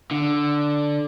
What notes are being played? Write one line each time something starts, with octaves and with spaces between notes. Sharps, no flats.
D3